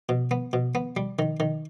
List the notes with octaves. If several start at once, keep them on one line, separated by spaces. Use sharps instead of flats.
B2
B3
B2
B3
G3
D#3
D#3